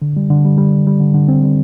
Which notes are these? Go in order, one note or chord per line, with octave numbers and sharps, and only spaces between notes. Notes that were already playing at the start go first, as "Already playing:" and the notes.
D3
G3
D3
G3
G3
G3
G3
D3
D3
C4
G3